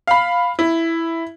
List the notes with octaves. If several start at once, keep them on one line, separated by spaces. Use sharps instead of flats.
F5 B5
E4